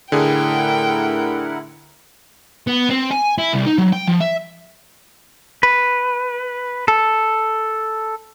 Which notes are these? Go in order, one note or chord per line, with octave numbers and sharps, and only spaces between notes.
A2 D3 E4 G#4 A#4 F#5 G5
B3
C4
G#5
E4
C2
D#4
F#3
G5
F3
E5
B4
A4